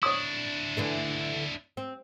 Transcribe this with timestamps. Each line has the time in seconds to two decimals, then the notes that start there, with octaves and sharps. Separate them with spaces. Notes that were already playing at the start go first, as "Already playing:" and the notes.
0.03 D4 E4 C#5 D#6
0.77 D3 E3 A3
1.77 C4